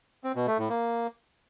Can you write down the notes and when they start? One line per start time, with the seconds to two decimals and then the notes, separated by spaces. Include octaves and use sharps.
0.24 C4
0.35 B2
0.47 A3
0.58 A2
0.69 A#3